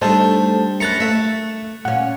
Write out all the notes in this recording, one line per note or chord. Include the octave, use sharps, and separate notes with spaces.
G3 A3 D4 D#4 C5 D#5 A5
F#2 A#5 B5 F#6 A6 C#7
A3 E5
A#2 C#4 F#5